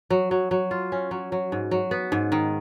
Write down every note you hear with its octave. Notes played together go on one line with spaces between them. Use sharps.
F#3
F#3
F#3
F4
C#4
F#3
F#3
G#2
F#3
B3
G#2
D#3